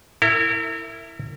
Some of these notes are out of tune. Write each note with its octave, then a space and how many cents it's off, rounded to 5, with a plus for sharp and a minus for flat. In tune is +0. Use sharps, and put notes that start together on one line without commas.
E4 +0 A#4 -40